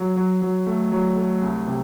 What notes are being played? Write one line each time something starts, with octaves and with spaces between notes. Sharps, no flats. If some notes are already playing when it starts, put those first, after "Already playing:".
Already playing: F#3
F#3
F#3
A3
F#3
A3
C2
C3